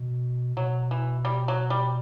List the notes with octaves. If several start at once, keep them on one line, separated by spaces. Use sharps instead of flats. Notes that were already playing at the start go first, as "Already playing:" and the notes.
Already playing: B2
B2 F#3
E3
G3
F#3
G3